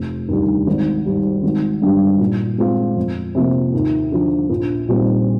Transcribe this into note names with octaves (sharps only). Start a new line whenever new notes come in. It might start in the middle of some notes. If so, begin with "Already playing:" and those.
Already playing: F1
D#2 D3 G3 D4
G#1
G#2 G3
G#1
G2 D3 G3
A#2
G#3 C4 F4
F2
C3 F3 A#3
D#2
D3 F3
A#1
A#2 G3 C4 D#4